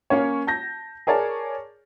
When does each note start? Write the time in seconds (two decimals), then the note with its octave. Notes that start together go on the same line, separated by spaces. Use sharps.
0.10 A#3 C#4 C#5
0.47 A5 G6 A#6
1.07 G#4 A#4 C#5 D5 A5